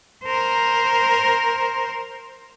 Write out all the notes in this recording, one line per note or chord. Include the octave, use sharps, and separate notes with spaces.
A#4 C5